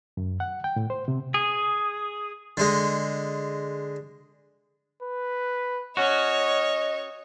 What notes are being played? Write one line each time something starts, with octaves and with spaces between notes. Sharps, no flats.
F#2
F#5
G5
A2
C5
C3
G#4
D3 G#3
B4
C#4 F#4 C#5 D#5